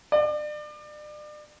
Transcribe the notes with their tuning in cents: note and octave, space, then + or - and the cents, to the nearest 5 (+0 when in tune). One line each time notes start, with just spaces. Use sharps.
D5 +35